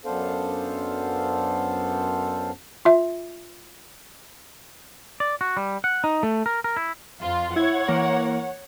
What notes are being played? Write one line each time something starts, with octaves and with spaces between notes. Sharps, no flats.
F#2 B3 D4 A4 C5 F5
F4 E5
D5
F#4
G3
F#5
D#4
A3
A#4
A#4
E4
F2 F4
E4 C#5 F#5 G#6
E3 A#3 A#4